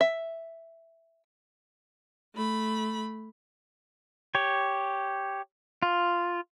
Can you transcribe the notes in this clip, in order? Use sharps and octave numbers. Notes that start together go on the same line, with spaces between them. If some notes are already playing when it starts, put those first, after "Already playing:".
E5
A3 B5
G4 C#5
F4